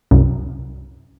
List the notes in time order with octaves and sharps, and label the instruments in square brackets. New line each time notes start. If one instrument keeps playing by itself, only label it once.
[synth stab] C2 F#2